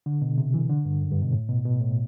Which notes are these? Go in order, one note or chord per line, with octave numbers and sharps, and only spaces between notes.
D3
B2
C3
E3
D3
G2
F#2
G2
B2
A2
B2
B2
A2